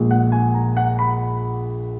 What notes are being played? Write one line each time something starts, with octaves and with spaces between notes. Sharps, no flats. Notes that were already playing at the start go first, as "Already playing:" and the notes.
Already playing: A#1 A#2 G#3
F#5
G#5
A#5
F#5
B5